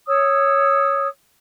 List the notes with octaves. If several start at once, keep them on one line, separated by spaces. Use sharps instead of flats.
C#5 D#6 E6